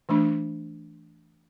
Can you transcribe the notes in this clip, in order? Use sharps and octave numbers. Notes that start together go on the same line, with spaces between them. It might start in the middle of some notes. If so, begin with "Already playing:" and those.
E3 A3 D4